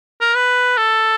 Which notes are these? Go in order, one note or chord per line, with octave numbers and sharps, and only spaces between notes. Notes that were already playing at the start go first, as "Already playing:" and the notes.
A#4
B4
A4